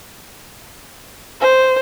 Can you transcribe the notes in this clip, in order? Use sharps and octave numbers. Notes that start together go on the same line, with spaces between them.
C5